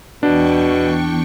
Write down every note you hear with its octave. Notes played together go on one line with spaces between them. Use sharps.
E2 B2 D4 G5 C#6